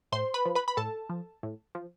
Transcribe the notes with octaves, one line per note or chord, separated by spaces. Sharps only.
A2 C5 C6
B4 B5
F3
B4 B5
B5
A2 A4 A5
F3
A2
F3